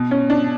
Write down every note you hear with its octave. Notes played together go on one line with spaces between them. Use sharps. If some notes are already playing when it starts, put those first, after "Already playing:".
Already playing: B2
C#4
D4